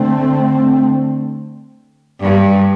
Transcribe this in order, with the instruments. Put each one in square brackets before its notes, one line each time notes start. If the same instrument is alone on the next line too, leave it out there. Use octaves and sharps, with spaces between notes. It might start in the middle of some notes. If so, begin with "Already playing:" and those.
Already playing: [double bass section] D3 A3 C4
[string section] G2